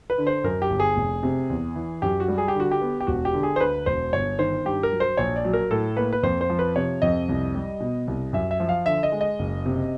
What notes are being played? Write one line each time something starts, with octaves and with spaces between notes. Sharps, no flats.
B4
D3
C5
F#2 A#4
G4
G1
G#4
F1
C3
E2
E3
F#2 G4
F#4
G3
G#4
G4
D3 F#4
G4
B3
G4
E1 F#4
G4
D3
G#4
C5
D2 B4
E1 C5
G1 C#5
D#3 C5
G2 G4
A#4
F#3
C5
A#1 C#5
D5
F#3
A#4
A2 A4
A#3 B4
B4
F2 C5
C5
F3
B4
C3 C#5
F2 D#5
C2
G3
B2
C2
F#2 E5
E5
F3
F5
D3 E5
D#5
G#3
D#5
F#1
C3